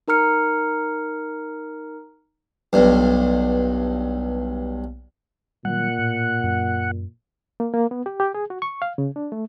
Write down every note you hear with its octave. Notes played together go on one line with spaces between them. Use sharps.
D#4 A#4 A#5 F6 C#7
B1 G2
A#2 D#3 F#3 G3 F#5
A2
F#2
A#3
A#3
B3
G4
G4
G#4
F#4
C#6
F5
C#3
D4
A3